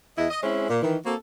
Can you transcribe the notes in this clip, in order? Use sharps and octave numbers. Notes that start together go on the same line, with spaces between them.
E2 E4 D#5
D#5
G#3 C4 C#4 E4
A#2
D#3 E3
A#3 C4 F#4 A4